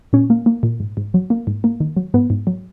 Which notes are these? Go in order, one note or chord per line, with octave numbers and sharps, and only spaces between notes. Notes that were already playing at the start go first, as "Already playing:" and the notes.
A#2 C#4
A#3
A#3
A#2
G#2
G#2
F#3
A#3
G#2
A#3
D#3
F#3
G#2 B3
G#2
F#3